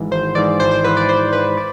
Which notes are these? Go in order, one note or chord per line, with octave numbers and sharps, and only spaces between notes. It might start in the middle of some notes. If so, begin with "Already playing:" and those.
Already playing: G#1 G#2 E3
G#1 C5
G#2 E3 D5
G#1 C5
C5
G#2 E3 B4
D5
G#1 C5
G#2 E3 B4
D5